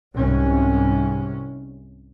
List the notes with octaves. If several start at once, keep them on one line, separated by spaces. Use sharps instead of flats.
C2 G#2 C#4